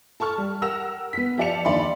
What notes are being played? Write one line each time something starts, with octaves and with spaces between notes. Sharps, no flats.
A4 A5 C#6 F6
G3
G4 A#4 F#5 E6 A#6 F7
B3 B6
F3 G4 D5 A5 C#7 F7
D#2 D3 D#4 D5 B5 C6